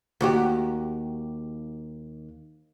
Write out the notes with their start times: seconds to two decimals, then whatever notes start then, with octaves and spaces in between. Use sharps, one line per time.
0.21 D#2 F#4 G4